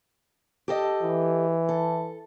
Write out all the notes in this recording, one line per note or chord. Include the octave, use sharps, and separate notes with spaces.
G4 A4 D#5
E3
A4